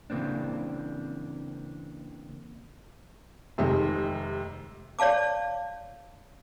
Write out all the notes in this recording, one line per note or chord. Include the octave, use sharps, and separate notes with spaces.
C#3 E3 A#3 C4 D4
F1 C3 D#3 G#3 D#4
C#5 D5 F5 A5 D6